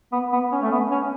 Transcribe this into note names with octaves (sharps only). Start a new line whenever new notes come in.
B3
B3
C#4
A3
B3
C#4